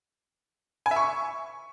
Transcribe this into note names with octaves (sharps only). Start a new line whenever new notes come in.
G#5
E5
C#6